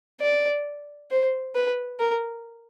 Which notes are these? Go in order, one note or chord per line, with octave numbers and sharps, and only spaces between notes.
D5
C5
B4
A#4